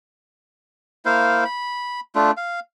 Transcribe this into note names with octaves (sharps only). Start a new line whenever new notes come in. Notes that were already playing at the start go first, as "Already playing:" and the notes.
A#3 E4 C5 F5
B5
A3 D4 F4
F5